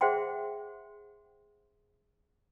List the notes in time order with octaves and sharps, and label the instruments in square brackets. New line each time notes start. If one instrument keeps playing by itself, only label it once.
[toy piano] G#4 C5 E5 F#5 G5 C6